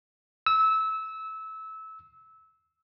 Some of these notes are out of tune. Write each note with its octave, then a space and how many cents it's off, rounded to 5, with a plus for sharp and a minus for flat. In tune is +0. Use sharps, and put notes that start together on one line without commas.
E6 -20